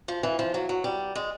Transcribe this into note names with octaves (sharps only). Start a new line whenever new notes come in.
F3
E3
F3
F#3
F#3
G3
G#3